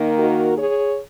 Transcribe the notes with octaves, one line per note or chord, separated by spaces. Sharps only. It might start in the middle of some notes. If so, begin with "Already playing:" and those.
Already playing: D#3 A#3 D#4
F#4 A#4
G#4 C#5